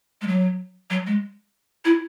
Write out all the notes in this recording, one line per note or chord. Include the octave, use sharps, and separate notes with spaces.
G#3
F#3
F#3
G#3
E4